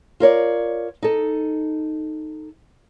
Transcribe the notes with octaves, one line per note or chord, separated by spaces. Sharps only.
F4 A#4 C#5 D5
D#4 A4